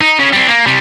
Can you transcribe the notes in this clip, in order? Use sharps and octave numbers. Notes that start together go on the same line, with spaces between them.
D#4
C#3
G3 C4
A#3
C3 G3